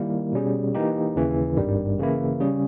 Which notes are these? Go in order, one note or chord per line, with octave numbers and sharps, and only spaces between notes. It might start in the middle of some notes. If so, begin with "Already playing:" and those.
Already playing: D#3 G3 A#3 E4
B2 G3 C#4 G#4
E3 A#3 D#4 G4
D#2 C#3 E3
G#1 G2 D#3 G3
C#3 E3 A#3 E4
C#3 G3 C#4 G#4